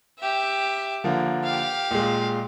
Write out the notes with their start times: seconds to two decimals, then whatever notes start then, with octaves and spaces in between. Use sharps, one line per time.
0.19 G4 E5
1.04 D3 F3 A#3
1.44 G4 F5
1.91 A#2 G#3